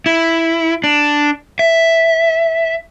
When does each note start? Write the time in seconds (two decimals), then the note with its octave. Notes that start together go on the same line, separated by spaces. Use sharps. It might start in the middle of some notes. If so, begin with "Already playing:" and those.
0.06 E4
0.84 D4
1.59 E5